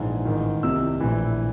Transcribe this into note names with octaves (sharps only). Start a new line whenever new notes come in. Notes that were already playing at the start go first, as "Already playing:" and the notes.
Already playing: A#1 G#2 E3
A1 G#2 D#3
C2 C3 D#3 E6
A#1 A2 E3